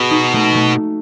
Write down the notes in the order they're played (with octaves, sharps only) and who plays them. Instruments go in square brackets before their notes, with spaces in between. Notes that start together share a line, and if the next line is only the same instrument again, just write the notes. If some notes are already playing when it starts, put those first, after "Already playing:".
Already playing: [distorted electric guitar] B2 [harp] F#4 G#4
[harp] D#4
A3
A3